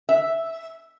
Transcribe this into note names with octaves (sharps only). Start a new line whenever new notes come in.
E5